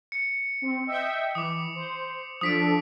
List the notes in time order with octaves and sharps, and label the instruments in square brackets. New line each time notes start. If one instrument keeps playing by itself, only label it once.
[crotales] C#7
[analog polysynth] C4
D#5 E5 G5
[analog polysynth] E3 [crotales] D6 D#6
[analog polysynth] C5
[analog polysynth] F3 D4 A4 [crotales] D#6 B6 D7